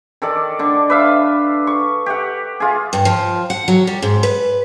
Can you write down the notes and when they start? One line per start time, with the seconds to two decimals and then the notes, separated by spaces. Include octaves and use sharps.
0.22 D#3 A4 D5
0.59 D3 D4
0.90 B4 E5 F5
1.67 C#6
2.06 G4 F#5
2.60 F4 G#4
2.93 G2
3.05 F3
3.50 F#5
3.68 F#3
3.87 G3
4.02 G#2
4.23 B4